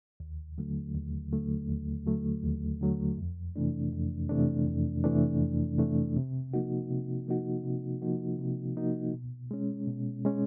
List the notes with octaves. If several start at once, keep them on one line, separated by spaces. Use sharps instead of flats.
D#2
D3 F#3 A3
D#2
D3 F#3 A3
D#2
D3 F#3 A3
D#2
D3 F#3 A3
F2
C3 E3 A3 D4
F2
C3 E3 A3 D4
F2
C3 E3 A3 D4
F2
C3 E3 A3 D4
C3
F3 A#3 D#4 F#4
C3
F3 A#3 D#4 F#4
C3
F3 A#3 D#4 F#4
C3
F3 A#3 D#4 F#4
B2
G#3 C#4
B2
G#3 C#4